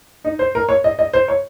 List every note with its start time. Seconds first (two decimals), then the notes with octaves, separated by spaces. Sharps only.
0.24 D#4
0.39 C5
0.55 A#4
0.69 C#5
0.84 D#5
0.99 D#5
1.13 C5
1.28 C#5